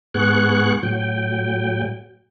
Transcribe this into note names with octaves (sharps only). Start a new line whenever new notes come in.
G#2 B3 G#4 F#5 C#6 F#6
A2 F#3 G5